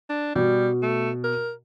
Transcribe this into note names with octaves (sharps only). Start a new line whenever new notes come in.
D4
B2 G3
A3
A#4